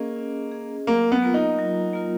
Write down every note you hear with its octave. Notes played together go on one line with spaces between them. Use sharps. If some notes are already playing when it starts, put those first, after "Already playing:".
Already playing: A#3 C#4 G#4 D#5
C#4
G#4 D#5
F#3 A#3
B3
A#3 F4 A#4
D#4
F#3
A#3 F4 A#4